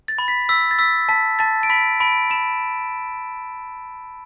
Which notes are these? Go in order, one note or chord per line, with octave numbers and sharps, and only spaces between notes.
A6
B5
B6
E6 B6
A6
E6 B6
A5 B6
A5 A6
D7
B5 B6
B5 D7
B5 E7